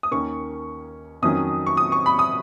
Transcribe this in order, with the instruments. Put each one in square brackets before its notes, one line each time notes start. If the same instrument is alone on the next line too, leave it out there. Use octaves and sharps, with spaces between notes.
[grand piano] D#6
D#2 D#3 A#3 C#4 C#6
F2 D#3 F#3 C#4 D#6
C#6
D#6
C#6
B5
D#6